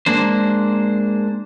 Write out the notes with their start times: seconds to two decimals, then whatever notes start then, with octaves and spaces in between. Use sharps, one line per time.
0.06 G#3 A#3 D4 C5